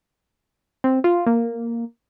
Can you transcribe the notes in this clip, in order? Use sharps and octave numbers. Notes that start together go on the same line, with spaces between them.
C4
F4
A#3